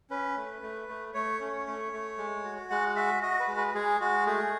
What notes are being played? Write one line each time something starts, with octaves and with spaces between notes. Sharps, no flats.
C#4 B4
A3
A3
A3
A3 C#5
C#4
A3
A3
G#3
F#4
G#3 F#5
F#4 E5
F#4 D#5
B4
G#3
B4
G#3 G#4
G#3 F#4
A3 G#4